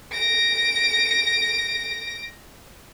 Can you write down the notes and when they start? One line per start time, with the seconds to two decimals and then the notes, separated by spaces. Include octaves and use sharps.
0.12 A#6 D7